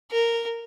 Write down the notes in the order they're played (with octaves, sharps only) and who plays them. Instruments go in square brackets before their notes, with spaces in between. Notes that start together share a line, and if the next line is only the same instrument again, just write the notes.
[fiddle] A#4